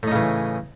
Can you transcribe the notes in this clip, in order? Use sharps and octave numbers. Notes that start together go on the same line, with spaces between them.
A2 C#3 E3 D#4